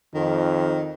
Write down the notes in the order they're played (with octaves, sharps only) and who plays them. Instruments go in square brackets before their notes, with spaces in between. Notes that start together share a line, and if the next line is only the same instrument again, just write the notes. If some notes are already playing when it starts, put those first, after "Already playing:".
[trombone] F2 [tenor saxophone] D#3